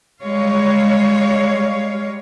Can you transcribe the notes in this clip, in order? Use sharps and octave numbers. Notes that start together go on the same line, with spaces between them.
G3 G#3 C#5 F5